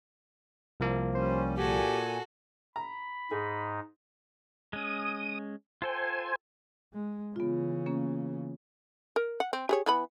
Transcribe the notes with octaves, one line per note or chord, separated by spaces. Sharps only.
C2 F3 A#3
G3 C#4 C5
A#2 F#4 G4 A4 G#5
A#5 B5
G#2 D#4 G#4
G#3 C#4 D#6
F4 A4 C5 G5 G#5
G#3
C#3 E3 B3 F4
A#3 C#4
A#4
F#5
C4
G4 G#4 C#5
E3 B3 B5